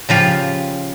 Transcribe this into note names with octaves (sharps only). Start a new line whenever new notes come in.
C#3 F3 F4 G4